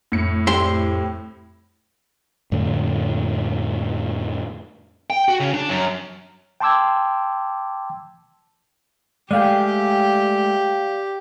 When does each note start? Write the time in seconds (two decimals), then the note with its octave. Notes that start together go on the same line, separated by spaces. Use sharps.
0.12 F2 A2 C#7
0.47 C4 E4 G4 C6
2.52 F2 A2 D3
5.10 G5
5.28 F#4
5.40 C#3
5.54 D4
5.69 F#2
6.60 G5 A5 C6 D6 E6 G#6
9.31 G#3 A3 G4 G#4 D5 F5 G5